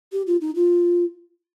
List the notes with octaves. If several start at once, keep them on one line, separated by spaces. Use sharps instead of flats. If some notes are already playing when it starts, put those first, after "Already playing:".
G4
F4
D#4
F4